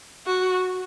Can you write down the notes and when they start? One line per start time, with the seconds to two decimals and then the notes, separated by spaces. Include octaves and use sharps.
0.26 F#4